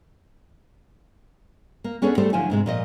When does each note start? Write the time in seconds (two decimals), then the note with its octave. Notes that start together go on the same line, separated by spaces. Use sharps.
1.84 A#3
2.02 B3 C#4 D4 G#4 A4 C#5
2.18 G3 A3 G4 A4 C5
2.33 D3 F3 F#3 E4 G#5
2.50 G#2 C3 G#3
2.66 A#2 F3 D#5